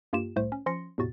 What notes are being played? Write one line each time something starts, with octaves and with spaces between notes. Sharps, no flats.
G2 A#3 F4 G4 E7
C2 A2 A3 C5
C#4
F3 C#4 C6 A#6 C#7
E2 A2 C3 F#4 A6